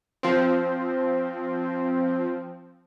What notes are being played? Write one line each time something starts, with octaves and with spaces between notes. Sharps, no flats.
F3 C4